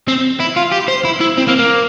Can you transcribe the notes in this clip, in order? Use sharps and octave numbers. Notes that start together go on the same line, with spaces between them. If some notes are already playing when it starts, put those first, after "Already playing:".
C4
E4
F4
G4
C5
E4
E4
C4
A#3
A#3